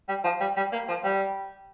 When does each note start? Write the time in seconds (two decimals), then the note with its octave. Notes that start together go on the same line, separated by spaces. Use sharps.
0.08 G3
0.24 F3
0.40 G3
0.57 G3
0.72 A#3
0.88 F3
1.04 G3